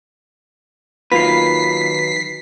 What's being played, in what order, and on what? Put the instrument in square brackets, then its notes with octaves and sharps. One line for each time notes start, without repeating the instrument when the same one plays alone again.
[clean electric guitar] D#3 F#3 B4 [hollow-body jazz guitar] A#3 F4 [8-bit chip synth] B6 C7